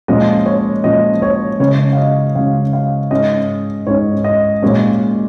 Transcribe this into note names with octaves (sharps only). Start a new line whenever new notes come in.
A#2 F3 G#3 C#4 D#5
C#5
A#2 F3 G#3 C#4 D#5
C#5
C#3 G#3 C#4 C#5
F5
D#5
C#3 G#3 C#4 F5
F5
G#2 G#3 C#4 D#5
G#2 G#3 C#4 C#5
D#5
A#2 G#3 C#4 C#5